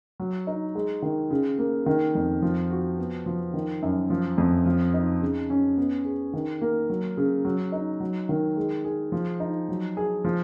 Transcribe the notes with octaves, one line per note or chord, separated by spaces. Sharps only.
F#3
D#4
G#3
D#3
C#3
A#3
D#3
F2
F3
F#4
B3
F3
D#3
F#2
F3
F2
F3
D#4
C#3
C#4
B3
G#4
D#3
A#3
F#3
C#3
F#3
D#4
F#3
D#3
G#3
G#4
F3
D#4
F#3
G#4
F3